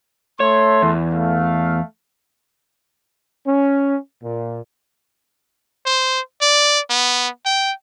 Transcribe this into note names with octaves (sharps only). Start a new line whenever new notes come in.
A3 C#5 C6
E2
A3 F5
C#4
A#2
C5
D5
B3
G5